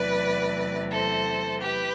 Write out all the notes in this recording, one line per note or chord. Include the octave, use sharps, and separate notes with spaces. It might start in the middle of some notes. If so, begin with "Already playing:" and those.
Already playing: E2 C3 F#3 A3 B4 D5
A4 C5
G4 B4